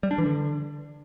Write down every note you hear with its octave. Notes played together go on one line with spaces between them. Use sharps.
G3
D4
E3
D3